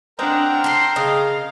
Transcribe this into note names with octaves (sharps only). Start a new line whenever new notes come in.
G#3 C4 D4 A#4 F#5 G5 A#5
D4 A4 C6 C7
C#3 D#5 F5